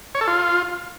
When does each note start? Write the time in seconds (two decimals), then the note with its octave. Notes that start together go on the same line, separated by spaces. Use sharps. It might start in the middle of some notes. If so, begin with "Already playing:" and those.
0.15 C#5
0.21 A4
0.27 F4